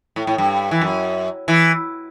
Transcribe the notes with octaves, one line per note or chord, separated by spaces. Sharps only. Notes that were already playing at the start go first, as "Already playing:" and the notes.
A2
A2
G2
E3
F#2
E3